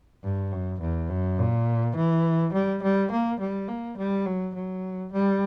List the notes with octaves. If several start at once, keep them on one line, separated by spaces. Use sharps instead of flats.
G2
F#2
E2
F#2
A#2
E3
G3
G3
A#3
G3
A#3
G3
F#3
F#3
G3